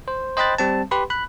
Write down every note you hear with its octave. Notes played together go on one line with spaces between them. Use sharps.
C5
C5 D#5 G5 B5 F#6 A6
G3 C4 A5
G4 B4 B5 C6
B5 F#6